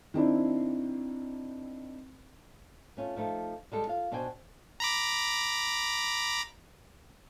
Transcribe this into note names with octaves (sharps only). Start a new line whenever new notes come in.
D#3 C4 D4 E4
A3 C#4 F4
F3 A3 D#4 F4
G3 G#3 A4
F4 F5
B2 D4 F#4 C5 G5 G#5
A#5 B5 D6